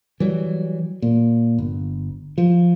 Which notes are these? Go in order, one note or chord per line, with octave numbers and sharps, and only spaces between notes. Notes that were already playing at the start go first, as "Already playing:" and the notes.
E3 F#3 G3
A#2
G1
F3